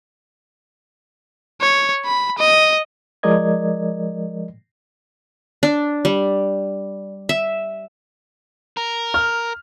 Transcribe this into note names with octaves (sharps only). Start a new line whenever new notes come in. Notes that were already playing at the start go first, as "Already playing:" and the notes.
C#5
B5
D#5
F3 G#3 A#4 D5 D#5 G#6
D4
G3
E5
A#4
F6